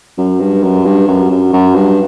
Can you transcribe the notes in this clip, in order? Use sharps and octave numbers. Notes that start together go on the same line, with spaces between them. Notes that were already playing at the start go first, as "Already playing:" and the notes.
F#2
G2
F#2
G2
F#2
F#2
F#2
G2